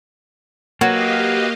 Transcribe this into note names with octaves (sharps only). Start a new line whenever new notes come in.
F#3 A#3 F#4 G4 B4 D#5 F5